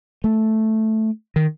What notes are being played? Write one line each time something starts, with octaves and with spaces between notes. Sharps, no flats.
A3
D#3